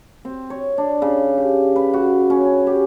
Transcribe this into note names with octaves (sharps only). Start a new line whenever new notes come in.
C4
C#5
D4
C#3
G4
B4
F#4
C#4
C#4
G4